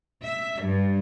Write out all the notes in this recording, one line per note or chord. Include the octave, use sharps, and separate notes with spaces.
E5
G2